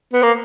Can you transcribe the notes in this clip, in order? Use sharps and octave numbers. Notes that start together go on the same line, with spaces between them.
B3
A#3